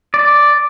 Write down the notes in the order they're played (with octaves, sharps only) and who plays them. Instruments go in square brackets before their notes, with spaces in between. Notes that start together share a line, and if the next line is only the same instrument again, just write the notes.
[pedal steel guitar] D5